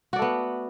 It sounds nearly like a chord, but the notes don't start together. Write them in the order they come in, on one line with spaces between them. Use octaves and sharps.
F#4 D5 A3 B3